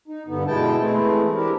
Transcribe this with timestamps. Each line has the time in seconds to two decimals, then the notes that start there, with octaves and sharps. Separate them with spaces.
0.08 D#4
0.27 G2 D3 B3
0.47 B2 G#3 E4 G5 A5
0.79 E3 G#3 A3 C4 E4
1.35 D4 E4 G4 A#4